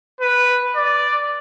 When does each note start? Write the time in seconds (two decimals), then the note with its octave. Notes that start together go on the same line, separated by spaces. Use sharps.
0.21 B4
0.76 D5